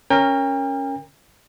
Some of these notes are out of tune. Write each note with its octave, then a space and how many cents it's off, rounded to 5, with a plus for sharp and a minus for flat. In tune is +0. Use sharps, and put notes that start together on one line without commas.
C#4 +0 A#4 +0 G5 +40